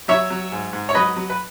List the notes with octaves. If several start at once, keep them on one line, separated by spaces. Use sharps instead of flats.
F#3 C#5 E5
F#3
G#2
G#2
C#5
F#3 B4 D#5
F#3
B4